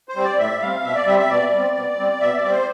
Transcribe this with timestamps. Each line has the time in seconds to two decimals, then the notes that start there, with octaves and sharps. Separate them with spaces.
0.09 C5
0.16 G3 C4
0.24 D5
0.38 A2 E5
0.62 G3 C4 F5
0.84 B2 E5
0.95 D5
1.07 G3 C4 E5
1.19 E5
1.30 B2 D5
1.53 G3 C4
1.76 B2
1.98 G3 C4
2.21 B2 E5
2.36 D5
2.44 G3 C4
2.51 C5